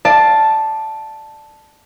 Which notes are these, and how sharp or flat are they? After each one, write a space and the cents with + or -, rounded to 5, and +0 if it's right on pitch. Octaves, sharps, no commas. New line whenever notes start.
D5 +20 F5 +0 A5 +0